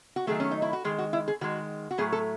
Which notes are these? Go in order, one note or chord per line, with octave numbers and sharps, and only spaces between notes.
F#4
D#3 F#3 A3 G#4
C#4
D#4
E4
F#4
D#3 G#3 G#4
F#4
E4
G#4
D#3 G#3 F#4
F#4
A2 F#3 A3 G#4
A4